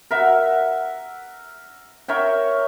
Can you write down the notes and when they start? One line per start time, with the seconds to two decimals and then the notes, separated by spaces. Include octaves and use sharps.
0.11 A#4 E5 F#5
2.08 A#4 C#5 E5 G5